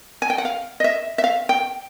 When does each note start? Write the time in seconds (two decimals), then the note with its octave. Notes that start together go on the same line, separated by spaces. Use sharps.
0.22 G#5
0.30 G5
0.38 F#5
0.45 F5
0.80 D#5
0.84 E5
1.18 E5
1.24 F5
1.49 G5